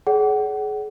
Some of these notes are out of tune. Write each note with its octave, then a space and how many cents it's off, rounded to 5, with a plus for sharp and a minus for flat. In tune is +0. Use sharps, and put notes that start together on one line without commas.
G#4 +30 D5 -40 F#5 +30